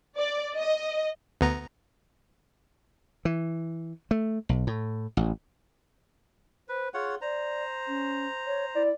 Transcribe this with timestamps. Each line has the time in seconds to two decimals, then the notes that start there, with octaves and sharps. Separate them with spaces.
0.17 D5
0.57 D#5
1.41 D2 B3 A#5
3.25 E3
4.11 A3
4.49 B1
4.67 A2
5.17 A1
6.69 B4 C5
6.94 F4 G#4 C#5 F#5
7.21 C5 D5 A#5
7.87 C#4
8.46 C#5
8.75 E4 D5